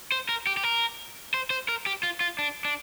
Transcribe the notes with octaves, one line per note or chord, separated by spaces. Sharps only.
C5
A#4
G4
G4
A#4
C5
C5
A#4
G4
F4
F4
D4
D4